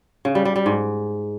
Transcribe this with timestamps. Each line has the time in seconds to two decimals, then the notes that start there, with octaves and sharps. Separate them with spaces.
0.25 C#3
0.35 G3
0.45 G3
0.56 G3
0.66 G#2